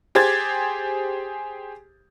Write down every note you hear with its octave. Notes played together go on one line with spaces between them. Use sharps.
G4 G#4 C5 G#6 A6